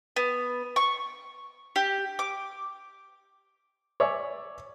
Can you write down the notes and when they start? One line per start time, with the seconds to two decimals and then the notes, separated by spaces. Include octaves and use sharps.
0.16 B3
0.76 C#6
1.76 G4
2.19 D6
4.00 C#5 D5 E5 G#5